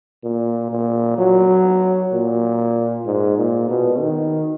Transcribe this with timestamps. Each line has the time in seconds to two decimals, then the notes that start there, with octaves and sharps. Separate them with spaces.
0.24 A#2
0.71 A#2
1.18 F#3
2.12 A#2
3.06 G#2
3.38 A#2
3.69 B2
4.00 D#3